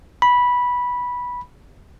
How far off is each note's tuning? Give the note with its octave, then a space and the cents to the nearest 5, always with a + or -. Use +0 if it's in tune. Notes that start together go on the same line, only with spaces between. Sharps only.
B5 -10